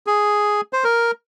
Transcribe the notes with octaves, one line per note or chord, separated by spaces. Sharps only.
G#4
C5
A#4